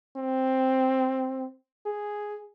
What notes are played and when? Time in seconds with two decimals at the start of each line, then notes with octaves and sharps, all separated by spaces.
0.17 C4
1.86 G#4